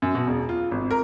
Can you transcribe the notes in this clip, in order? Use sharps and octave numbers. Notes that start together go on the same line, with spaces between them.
F#2
B2
E1
F4
G#1
A#4